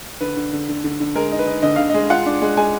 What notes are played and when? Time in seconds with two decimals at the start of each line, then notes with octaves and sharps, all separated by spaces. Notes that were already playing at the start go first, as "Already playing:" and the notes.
0.21 D3 B4
0.36 D3
0.53 D3
0.69 D3
0.84 D3
1.00 D3
1.15 G#3 A#4
1.32 D#4
1.39 B4
1.47 D#4
1.63 D3 D#5
1.76 D3 F5
1.90 D#5
1.94 G#3
2.10 F4 F#5
2.26 D4
2.42 G#3
2.57 G#3 G#5